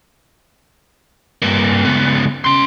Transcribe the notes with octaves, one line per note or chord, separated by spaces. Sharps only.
G2 A#3
C#2 B3
C#4 C6